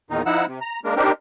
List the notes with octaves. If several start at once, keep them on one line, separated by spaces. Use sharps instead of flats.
E2 A#2 D#3 D#4
F3 D#4 E4 F#5 E6
C3
A#5
G#3 A#3 D4 A#4
C4 D4 D#4 G4 A#4